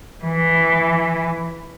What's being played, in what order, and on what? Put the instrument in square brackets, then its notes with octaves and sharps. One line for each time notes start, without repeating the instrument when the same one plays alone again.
[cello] E3